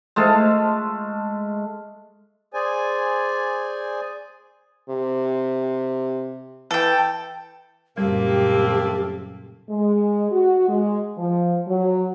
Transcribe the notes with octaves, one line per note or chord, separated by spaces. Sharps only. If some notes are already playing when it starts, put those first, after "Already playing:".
G#3 A3 F5 A5
G#4 C5 D5 G#5
C3
E3 A4 G5
F#1 F#2 A#2 G3 A3 A#3 C4 G4
G#3
F#4
G#3
F3
F#3